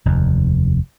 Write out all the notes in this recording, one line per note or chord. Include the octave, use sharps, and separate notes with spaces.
F1 D#2